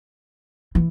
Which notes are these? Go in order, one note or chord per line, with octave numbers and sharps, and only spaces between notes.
E3